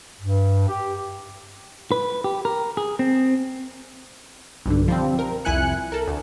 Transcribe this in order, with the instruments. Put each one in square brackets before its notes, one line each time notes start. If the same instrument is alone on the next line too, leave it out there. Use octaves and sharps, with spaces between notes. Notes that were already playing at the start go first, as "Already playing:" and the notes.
[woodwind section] G2
G4
[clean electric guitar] B4
G4
A#4
G#4
C4
[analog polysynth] B1 G2 D3
F3 G3 C4
A#4
C2 F2 E4 G#5 F#6 C#7
A4 A#4
D2